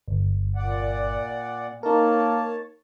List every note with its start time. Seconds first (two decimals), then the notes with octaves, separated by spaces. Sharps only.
0.08 G1
0.56 A#2 D5 F#5
1.83 A#3 D#4 A#4 C#5 A5